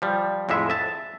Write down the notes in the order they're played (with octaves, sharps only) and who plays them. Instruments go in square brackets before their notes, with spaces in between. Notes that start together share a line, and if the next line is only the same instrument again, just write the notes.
[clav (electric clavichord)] F3 G3
F2 A2 G#3 E5
E5 A5